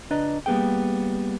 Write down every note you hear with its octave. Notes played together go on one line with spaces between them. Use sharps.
C#2 D4 B4 D5 D#5 A#5
G3 A#3 B3 G#4 G5